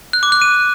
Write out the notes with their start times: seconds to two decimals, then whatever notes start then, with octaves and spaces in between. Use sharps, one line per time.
0.13 F#6
0.23 D6
0.32 F#6
0.42 D#7